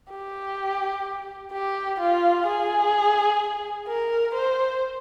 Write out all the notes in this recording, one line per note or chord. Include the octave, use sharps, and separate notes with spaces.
G4
G4
F4
G#4
A#4
C5